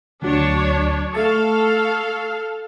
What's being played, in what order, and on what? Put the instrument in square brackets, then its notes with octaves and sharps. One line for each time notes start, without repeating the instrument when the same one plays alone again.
[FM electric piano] D2 F#3 [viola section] D4 C#5
[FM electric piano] A3 A5 C#6 [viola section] A4 F5